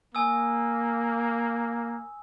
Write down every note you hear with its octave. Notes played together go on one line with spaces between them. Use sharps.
A#3 G#5 D#6 E6